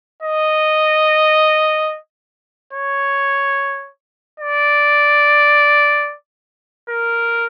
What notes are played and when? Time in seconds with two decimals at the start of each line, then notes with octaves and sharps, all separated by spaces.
0.23 D#5
2.73 C#5
4.40 D5
6.90 A#4